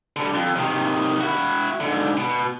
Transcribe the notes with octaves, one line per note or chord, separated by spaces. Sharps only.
D3 G3
F2
C3 D#3
E4 F#4
G#2 D3
B2